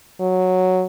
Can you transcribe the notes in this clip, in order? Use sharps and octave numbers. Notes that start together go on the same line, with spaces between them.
F#3